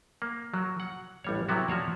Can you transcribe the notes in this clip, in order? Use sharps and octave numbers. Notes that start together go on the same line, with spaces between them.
A#3
F#3
F#5
A1 G3 C#5
C3 F#3 B3 E4 F#4
F3 F#4 C#5 D5